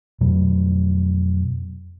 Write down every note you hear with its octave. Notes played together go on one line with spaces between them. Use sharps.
F2 B2 F#3